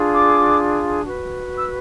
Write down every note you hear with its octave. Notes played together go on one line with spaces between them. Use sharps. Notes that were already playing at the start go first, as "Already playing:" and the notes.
Already playing: D4 F4 G#4
D6
F#4 B4
E6